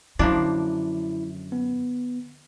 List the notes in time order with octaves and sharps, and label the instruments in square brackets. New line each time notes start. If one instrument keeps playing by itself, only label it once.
[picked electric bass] F#2 [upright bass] D3 [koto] F3 A#3 D4 [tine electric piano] E4
[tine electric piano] B3